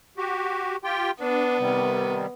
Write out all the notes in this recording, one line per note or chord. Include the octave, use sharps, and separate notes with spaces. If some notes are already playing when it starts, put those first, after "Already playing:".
F#4 G4
F4 G4 G5
B3 D4
C3 D#3 G3